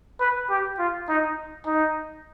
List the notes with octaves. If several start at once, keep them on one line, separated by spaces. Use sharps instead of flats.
B4
G4
F4
D#4
D#4